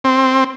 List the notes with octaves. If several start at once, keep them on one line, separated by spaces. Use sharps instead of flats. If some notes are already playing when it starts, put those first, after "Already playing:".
C4